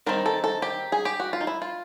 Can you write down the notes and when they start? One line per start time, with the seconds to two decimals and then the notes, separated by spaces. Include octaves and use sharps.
0.06 D#3 G3 C4 D#4 A#4
0.26 A4
0.44 A4
0.62 G4
0.92 G#4
1.05 G4
1.20 F#4
1.33 F4
1.41 D#4
1.47 E4
1.62 F4